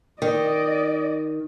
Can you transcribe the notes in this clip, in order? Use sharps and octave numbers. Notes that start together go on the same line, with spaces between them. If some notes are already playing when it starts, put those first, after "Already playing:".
D#3 D5 D#5